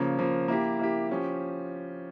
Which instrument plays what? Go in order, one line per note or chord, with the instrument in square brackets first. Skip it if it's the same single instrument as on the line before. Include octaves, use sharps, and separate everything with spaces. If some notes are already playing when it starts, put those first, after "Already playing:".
Already playing: [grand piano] C#3 F3 A#3
C#3 F3 A#3
A#3 E4 G4
A#3 E4 G4
F3 C#4 G4